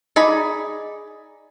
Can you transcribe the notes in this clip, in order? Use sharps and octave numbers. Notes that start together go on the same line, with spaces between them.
D#4 G#4 D5 B5